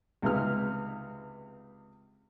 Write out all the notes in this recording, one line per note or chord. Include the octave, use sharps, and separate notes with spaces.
C#2 C3 G#3 B3 D#4 F6